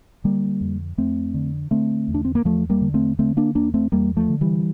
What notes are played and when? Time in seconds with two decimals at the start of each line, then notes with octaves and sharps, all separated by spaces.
0.24 D3 G3 A#3
0.61 F2
0.98 F2 A3 C4
1.34 D3
1.71 D3 A3 C4
2.08 E2
2.14 D4
2.25 C4
2.35 A#3
2.45 E2 F3 A3
2.70 G3 A#3
2.82 D3
2.94 A3 C4
3.19 D3 A3 C4
3.37 A#3 D4
3.55 E2 A#3 D4
3.74 A3 C4
3.92 E2 G3 A#3
4.16 F3 A3
4.29 D3
4.41 E3 G3